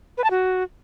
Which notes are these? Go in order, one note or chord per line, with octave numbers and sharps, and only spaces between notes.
B4
A5
F#4